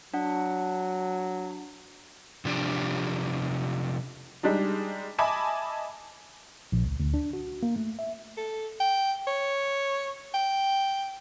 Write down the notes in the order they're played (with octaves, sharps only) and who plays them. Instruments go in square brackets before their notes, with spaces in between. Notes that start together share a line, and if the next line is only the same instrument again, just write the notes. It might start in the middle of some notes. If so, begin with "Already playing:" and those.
[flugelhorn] F#3 [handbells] D4 F#5
[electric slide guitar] C3 F3 D4 G4
[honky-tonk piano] G3 G#3 D4 D#4
D#5 E5 G#5 A5 B5 D6
[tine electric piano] A#1
C#2
D2
D4
F#4
A#3
A3
E5
[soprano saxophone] A4
G5
C#5
G5